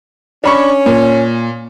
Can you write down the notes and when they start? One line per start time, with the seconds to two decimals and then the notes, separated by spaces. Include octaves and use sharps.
0.44 C#4 D4 B5 C#6
0.86 A#2